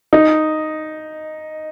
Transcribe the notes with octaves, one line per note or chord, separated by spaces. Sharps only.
D#4